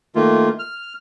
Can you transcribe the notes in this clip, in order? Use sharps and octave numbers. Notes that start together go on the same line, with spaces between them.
D#3 A3 A#3 F4
F6